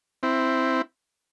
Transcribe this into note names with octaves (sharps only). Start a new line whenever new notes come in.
C4 E4